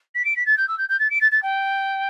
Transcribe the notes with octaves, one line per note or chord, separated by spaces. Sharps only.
B6
D7
B6
A6
G6
E6
G6
G6
A6
D7
A6
A6
G5